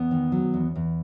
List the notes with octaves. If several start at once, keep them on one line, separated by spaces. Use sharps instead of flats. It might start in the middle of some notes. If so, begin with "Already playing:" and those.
Already playing: E2 B3
D#3
F#3
E2
E2